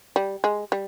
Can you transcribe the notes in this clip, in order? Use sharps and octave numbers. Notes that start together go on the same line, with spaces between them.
G3
G#3
G3